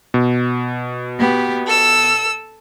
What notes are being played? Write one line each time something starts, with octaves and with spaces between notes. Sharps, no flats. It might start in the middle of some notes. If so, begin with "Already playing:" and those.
B2
B3 G4
A4 E6